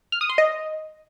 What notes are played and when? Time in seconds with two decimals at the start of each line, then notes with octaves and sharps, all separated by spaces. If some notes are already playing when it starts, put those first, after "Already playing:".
0.12 F6
0.21 D#6
0.29 C6
0.38 D#5